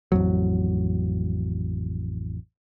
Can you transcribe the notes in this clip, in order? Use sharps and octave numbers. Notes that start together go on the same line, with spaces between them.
A1 F2 G#2 F#3